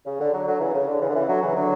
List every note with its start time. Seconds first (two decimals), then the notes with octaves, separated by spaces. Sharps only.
0.06 C#3
0.20 D3
0.33 D3 F#3
0.46 D3 F#3
0.60 C#3 E3
0.74 C#3
0.87 D3
1.01 C#3 E3
1.09 D3
1.14 C#3 E3
1.28 D3 F#3
1.42 C#3 E3
1.55 D3 F#3